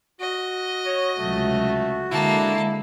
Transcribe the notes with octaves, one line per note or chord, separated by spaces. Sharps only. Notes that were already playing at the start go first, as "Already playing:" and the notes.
F#4 D#5
C#5
C#2 C3 F#3 A3
D3 G#3 A#3 E4 A5